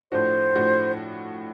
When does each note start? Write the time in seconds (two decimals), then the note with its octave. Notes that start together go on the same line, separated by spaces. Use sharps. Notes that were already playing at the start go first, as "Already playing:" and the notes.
0.12 A2 F3 A3 D4 F#4 C5
0.55 A2 F3 A3 D4 F#4